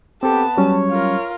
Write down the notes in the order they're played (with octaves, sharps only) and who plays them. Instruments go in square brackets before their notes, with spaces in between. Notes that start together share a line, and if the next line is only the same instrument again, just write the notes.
[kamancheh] B3 A5 [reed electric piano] C4 A4 [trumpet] G4
[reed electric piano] F#3 G3 C#4 [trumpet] C#5
[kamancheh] F4 A#4